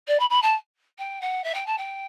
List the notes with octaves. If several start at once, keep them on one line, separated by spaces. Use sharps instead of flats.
D5
B5
B5
A5
G5
F#5
E5
G5
A5
G5